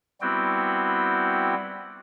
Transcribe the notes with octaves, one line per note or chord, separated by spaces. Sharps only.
G3 B3 C4 E4 F#4 G5